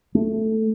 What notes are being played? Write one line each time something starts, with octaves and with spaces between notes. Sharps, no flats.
A3